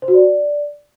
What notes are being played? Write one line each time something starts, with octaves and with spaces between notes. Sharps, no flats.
C5
F#4
D5